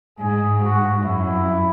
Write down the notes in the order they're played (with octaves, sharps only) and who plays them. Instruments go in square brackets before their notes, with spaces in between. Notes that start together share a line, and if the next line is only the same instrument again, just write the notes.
[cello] G#2 [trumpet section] G#4
[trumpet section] F#4
[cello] F#2 [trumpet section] E4